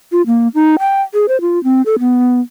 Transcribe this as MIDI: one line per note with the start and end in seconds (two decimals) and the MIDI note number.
0.12 0.22 65
0.27 0.48 58
0.55 0.76 63
0.79 1.02 79
1.14 1.26 68
1.28 1.40 72
1.41 1.62 65
1.64 1.82 60
1.86 1.96 69
2.00 2.40 59